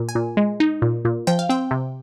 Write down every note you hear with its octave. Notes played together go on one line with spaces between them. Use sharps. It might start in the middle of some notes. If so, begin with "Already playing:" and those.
Already playing: A#2
G#5
A#2
G#3
D#4
A#2
A#2
F3 G5
F5
C4 G5
C3